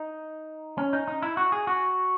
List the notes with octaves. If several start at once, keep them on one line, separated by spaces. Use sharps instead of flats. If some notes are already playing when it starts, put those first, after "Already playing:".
Already playing: D#4
C#4
D#4
D#4
E4
F#4
G#4
F#4